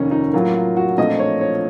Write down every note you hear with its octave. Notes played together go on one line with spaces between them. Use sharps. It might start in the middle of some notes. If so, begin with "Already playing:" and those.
Already playing: F1 D#2 D#3 A#3 C#4 D#4
D#4
A2 F#3 A#3 F4
F4
F#4
A#1 A#2 A3 C4 D#5
C#5
C#5